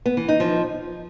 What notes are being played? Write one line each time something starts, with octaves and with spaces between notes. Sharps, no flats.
B3
E3
D#4
F3